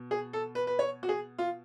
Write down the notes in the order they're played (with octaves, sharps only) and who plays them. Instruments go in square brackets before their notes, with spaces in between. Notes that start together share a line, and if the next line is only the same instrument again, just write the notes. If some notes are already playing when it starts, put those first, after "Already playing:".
Already playing: [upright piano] B2
G#4
A4
B4
B4
C#5
F#4
G#4
F4